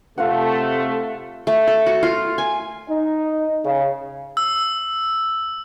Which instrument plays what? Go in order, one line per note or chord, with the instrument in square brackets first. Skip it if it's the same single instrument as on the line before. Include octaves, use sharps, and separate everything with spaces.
[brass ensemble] C3 A3 [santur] F4 F5 F#5
[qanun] A3
A4
F#4
F4
G#5
[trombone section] D#4
C#3
[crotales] E6